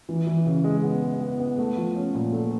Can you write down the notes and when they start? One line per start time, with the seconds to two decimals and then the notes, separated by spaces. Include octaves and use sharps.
0.09 E3
0.27 E3
0.46 C#3
0.64 G#3
0.83 B3
1.03 G#3
1.21 B3
1.40 B3
1.58 A3
1.77 F3
1.96 C#4
2.15 A#2
2.32 A3